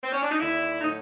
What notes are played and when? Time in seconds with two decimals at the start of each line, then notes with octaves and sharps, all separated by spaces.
0.04 C4
0.12 C#4
0.22 D4
0.31 D#4
0.40 D#2 D3 G3 E4
0.81 A2 F#3 D#4